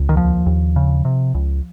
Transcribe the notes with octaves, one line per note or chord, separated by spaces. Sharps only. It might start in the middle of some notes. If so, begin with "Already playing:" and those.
Already playing: C#2
D#3
D#2 F3
D#2
C#3
C3
C#2